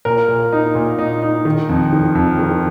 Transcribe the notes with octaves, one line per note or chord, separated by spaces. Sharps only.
A#2 A#4
A#2
D#4
A#2
D#4
D#4
D#3
F2
D#3
F2
D#3